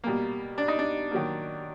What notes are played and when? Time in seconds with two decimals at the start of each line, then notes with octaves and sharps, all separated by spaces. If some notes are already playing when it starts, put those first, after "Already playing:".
0.04 B2 G3 A#3
0.58 D4
0.68 D#4
0.79 D4
1.11 D#3 F#3 A#3